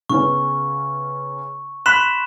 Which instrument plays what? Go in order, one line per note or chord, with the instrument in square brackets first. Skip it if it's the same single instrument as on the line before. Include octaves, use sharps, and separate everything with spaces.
[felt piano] C#3 B3 C#4 [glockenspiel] C#6
[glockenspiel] B5 C6 E7 [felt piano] F#6 B6